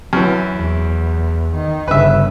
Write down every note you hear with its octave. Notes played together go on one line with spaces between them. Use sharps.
F#2 E3
E2
D#3
G1 C#3 B4 E5